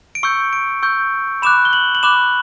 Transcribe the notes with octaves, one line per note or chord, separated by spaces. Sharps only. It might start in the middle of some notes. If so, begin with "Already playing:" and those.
D7
C#6 E6 G6 C#7
D7
C#6 E6 G6
B5 D6 F#6 E7
G7
F#7
F#7
B5 D6 F#6 E7